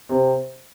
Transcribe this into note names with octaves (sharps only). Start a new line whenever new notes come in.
C3 C4